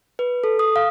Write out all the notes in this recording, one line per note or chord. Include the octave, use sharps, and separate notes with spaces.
B4
A4
D#6
F5